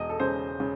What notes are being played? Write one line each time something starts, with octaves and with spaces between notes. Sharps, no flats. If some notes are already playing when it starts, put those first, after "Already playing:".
Already playing: E1 D#5
A4
C#3 C5
C#3